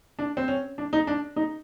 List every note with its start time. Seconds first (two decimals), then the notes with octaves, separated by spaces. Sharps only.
0.19 D4
0.37 C4
0.48 C#4
0.78 D4
0.93 D#4
1.07 D4
1.36 D#4